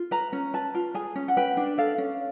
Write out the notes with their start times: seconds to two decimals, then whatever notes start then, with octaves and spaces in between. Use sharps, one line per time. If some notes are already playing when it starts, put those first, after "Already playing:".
Already playing: F4
0.11 B4 A#5
0.33 C#4
0.53 B4 A5
0.74 F4
0.95 G#4 G#5
1.16 C#4
1.28 F#5
1.37 B4 G5
1.57 D4
1.78 A4 F5
1.98 C#4